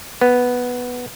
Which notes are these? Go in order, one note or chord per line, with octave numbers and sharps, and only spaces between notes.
B3